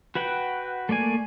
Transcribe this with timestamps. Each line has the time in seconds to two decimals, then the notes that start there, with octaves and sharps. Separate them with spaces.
0.15 F#4 B4 F#5 G5
0.89 A3 A#3 D5 G#5